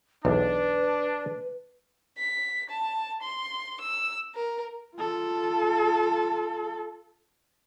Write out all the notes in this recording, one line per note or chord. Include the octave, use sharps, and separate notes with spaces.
B1 E2 D4 B4
B6
A5
C6
E6
A#4
F4 A4